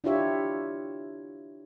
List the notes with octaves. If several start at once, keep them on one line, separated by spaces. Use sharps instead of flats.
D4 E4 F4 G4 C#5 E5